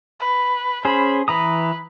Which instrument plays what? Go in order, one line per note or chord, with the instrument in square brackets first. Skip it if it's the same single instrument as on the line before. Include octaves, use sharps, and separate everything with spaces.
[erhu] B4
[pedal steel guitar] C#4 G#4 C5 [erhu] B5
[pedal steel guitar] E3 A#5 D#6 [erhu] B4